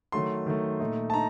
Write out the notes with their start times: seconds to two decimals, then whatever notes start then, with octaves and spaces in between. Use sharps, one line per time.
0.12 D#3 F#3 A3 C6
0.46 D#3 F#3 A3
0.80 A#2 A3 D#4
1.10 A5
1.14 D#4 A#5